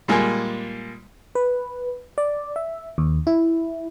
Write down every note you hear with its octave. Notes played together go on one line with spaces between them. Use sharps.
A#2 G3 G#3 A#3 G#4
B4
D5
E5
D#2
E4